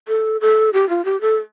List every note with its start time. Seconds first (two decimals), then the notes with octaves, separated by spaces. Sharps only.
0.08 A4
0.41 A4
0.73 G4
0.89 F4
1.05 G4
1.21 A4